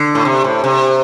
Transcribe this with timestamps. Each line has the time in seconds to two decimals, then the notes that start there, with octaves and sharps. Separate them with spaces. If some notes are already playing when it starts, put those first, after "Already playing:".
Already playing: D3
0.15 A2
0.25 C3
0.44 A2
0.64 C3